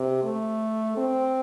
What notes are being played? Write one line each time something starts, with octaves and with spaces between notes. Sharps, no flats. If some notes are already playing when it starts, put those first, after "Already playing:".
Already playing: C3
A3
C4